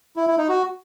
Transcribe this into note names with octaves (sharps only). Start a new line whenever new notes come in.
E4
E4
D#4
F#4